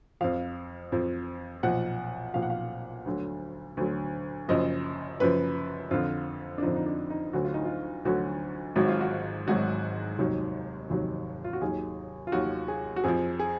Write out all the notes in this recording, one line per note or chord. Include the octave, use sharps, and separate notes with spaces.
F2 F3 F5
F2 F3
B1 A#2 F3 F#5
B1 A#2 F3 F5
F#5
F5
D2 D3 F#3
D2 D3 F#3
F#1 F#2 F3 D#5
F#1 F#2 F3 B4
F2 D3 F3 F4
D4
F2 D3 F3 D#4
D#4
D4
D#4
D2 D3 F#3 F#4
F4
D#4
F4
D2 D3 F#3 F#4
G#1 G#2 F#3 F#4
F4
F#4
G#1 G#2 F#3 F#4
F1 D#2 D#3 F#3
F1 D#2 D#3 F#3
F4
F#4
D#2 D#3 F#3 G#4
F4
D#2 D#3 F#3 F#4
G#4
F#4
F2 F3 G#4
G#4